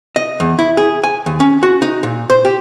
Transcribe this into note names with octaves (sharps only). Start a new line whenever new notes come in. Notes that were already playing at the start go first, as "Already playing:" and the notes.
D#5
E2
E4
G#4
G#5
D#2
C#4
F#4
D#4
A#2
C5
G4